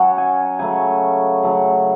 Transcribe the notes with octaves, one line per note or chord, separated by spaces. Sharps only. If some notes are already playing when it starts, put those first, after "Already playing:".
Already playing: F#3 C#4 F#5
G#5
C#3 F#3 A3 G#5
C#3 F#3 A3